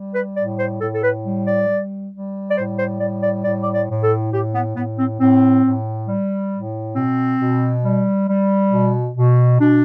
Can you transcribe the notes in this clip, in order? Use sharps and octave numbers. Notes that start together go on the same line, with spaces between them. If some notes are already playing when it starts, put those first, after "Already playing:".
Already playing: G3
B4
A2 D5
C5
A2 A4
A4
B4
G3
D5
G3
G3
D5
A2 C5
C5
G3 D5
D5
A2 D5
D5
D5
A2
A4
A2 G4
B3
A2 B3
C4
A2 C4
A2
G3
A2
B2 C4
B2
G3
G3
B2
B2
B2 D4